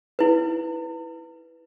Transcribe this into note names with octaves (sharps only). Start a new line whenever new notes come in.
E4 B4